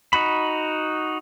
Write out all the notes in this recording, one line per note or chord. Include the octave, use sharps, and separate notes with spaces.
D#4 F#4 B5